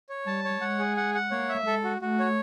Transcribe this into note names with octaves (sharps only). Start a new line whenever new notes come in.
C#5
G3 A5
C#5
G#3 F#5
G#4
F#5
F#5
A#3 C#5
E5
G#3 A4
F#4
A3 F#4
C#5